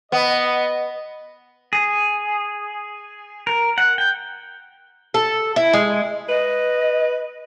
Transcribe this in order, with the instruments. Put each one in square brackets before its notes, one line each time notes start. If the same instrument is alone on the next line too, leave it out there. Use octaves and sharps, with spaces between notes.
[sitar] B3 [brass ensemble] D#5
[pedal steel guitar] G#4
A#4
F#5
G5
[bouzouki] A4
E4
G#3
[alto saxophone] B4 [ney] D#5